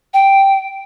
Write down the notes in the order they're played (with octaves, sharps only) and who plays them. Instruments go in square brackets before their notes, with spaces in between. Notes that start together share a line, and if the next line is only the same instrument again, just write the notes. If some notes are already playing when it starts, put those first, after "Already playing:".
[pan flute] G5